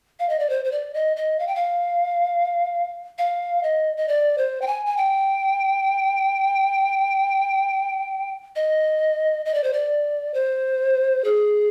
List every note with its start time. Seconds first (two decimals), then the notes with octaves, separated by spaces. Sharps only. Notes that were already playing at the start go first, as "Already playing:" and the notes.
0.19 F5
0.29 D#5
0.39 D5
0.50 C5
0.65 C5
0.72 D5
0.94 D#5
1.17 D#5
1.39 F5
1.47 G5
1.55 F5
3.18 F5
3.63 D#5
3.97 D#5
4.08 D5
4.38 C5
4.62 G5
4.67 G#5
4.86 G#5
4.97 G5
8.56 D#5
9.46 D#5
9.54 D5
9.64 C5
9.73 D5
10.34 C5
11.24 G#4